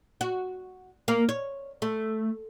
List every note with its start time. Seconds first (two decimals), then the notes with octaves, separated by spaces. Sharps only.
0.21 F#4
1.08 A#3
1.29 C#5
1.82 A3